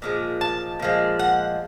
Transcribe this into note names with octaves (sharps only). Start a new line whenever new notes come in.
A#2 F3 G#3
A5
A#2 F3 G#3
F#5